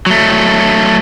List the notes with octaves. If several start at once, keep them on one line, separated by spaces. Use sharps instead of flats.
F#3 A3